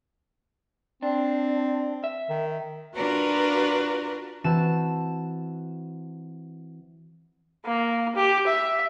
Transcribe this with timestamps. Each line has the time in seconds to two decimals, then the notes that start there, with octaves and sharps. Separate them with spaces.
1.03 C4 D4
2.04 E5
2.30 D#3
2.95 D4 F4 F#4 A#4 B4
4.44 E3 C4 F#4 A5 E7
7.65 A#3
8.15 G4
8.47 E5